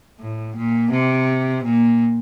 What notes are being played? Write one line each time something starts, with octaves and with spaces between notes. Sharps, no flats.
A2
A#2
C3
A#2